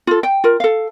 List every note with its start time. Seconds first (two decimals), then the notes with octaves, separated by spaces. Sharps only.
0.07 F4 A4
0.23 G5
0.44 F4 A#4
0.60 A4 F5